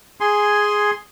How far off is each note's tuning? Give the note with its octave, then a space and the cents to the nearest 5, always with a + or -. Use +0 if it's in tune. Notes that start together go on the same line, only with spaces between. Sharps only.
G#4 +0 G#5 +0 C6 +0